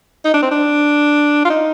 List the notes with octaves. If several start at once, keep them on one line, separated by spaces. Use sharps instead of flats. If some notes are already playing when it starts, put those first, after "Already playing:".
D#4
D4
C4
D4
F4
D#4